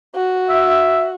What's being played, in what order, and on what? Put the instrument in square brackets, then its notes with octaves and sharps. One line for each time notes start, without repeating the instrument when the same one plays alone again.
[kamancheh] F#4
[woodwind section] E5